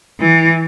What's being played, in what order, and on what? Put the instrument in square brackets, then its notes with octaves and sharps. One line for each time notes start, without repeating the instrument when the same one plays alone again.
[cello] E3